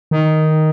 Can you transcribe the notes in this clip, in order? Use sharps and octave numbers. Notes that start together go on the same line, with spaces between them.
D#3